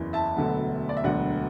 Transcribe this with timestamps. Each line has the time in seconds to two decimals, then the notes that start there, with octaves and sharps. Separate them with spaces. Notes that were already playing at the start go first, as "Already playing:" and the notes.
Already playing: F#1 E2 E3
0.13 E5 A5
0.36 E1 D2 D3 F#3 B3
0.89 D5
0.97 E5
1.04 E1 D2 D3 F#3 B3 D5 F#5